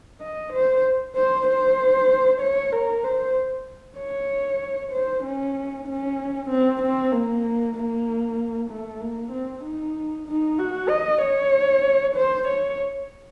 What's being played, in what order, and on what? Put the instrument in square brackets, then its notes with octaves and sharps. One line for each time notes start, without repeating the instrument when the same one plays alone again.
[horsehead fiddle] D#5
C5
C5
C5
C#5
A#4
C5
C#5
C5
C#4
C#4
C4
C4
A#3
A#3
A3
A#3
C4
D#4
D#4
F#4
D#5
C#5
C5
C#5